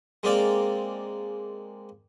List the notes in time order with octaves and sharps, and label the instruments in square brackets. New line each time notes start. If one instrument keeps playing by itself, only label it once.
[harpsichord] G#3 A#3 C4 D5 F5